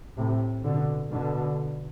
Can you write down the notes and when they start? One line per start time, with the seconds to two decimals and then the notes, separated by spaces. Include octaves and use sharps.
0.16 A2 C3
0.64 B2 D3
1.10 B2 D3